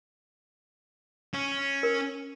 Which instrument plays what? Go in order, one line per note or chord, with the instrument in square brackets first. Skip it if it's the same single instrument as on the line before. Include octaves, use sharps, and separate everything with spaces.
[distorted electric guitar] C#4
[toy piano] A#4